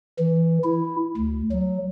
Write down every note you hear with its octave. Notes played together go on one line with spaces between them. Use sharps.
E3
E4
D2
F#3